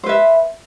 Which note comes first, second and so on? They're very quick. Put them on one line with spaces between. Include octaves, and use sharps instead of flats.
C5 B4 E5